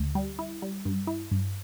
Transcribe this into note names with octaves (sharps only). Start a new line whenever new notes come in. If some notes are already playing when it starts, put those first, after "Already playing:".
Already playing: D2
G3
E4
G3
G2
E4
G2